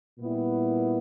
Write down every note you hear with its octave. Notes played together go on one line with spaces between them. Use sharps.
A#2 G3 B3 E4